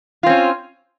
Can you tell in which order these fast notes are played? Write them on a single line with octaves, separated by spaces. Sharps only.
F4 C4 C#4